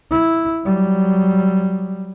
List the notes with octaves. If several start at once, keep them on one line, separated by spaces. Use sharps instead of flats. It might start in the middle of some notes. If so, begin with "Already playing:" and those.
E4
F#3 G3